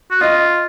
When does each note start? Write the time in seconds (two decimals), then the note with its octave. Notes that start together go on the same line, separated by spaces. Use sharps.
0.11 F#4
0.20 F4 D#5